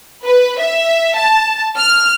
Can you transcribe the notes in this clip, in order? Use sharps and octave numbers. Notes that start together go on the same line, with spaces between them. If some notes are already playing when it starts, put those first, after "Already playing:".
B4
E5
A5
F6